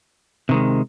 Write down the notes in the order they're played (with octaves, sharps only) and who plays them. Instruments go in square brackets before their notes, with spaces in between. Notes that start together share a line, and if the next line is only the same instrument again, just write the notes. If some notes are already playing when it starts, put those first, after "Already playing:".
[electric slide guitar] C3 D#3 G#3